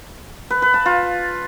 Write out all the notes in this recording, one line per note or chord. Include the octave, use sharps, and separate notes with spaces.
B4
B4
A5
F4